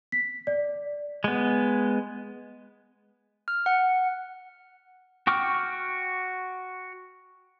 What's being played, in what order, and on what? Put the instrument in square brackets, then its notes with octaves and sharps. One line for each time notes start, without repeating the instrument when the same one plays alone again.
[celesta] B6
D5
[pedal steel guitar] G#3 B3
[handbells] F6
F#5
[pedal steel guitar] F#4 G5 C#6 D6 F6